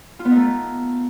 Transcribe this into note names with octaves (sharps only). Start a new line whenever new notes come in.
F4
B3
D#4
A3